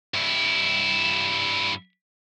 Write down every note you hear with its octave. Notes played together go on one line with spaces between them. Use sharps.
G2 E4